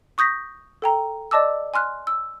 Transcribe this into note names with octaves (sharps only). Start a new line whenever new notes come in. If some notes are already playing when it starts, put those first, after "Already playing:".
C#6 D#6 G6 A#6 B6
A4 G5 A#5
D5 D#5 A5 D6 E6
G#5 C6 F6 F#6
E6